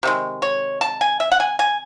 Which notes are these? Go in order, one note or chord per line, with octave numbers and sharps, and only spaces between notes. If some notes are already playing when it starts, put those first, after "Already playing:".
C3 D#3 G#3
C#5
A5
G#5
E5
F#5
G#5
G#5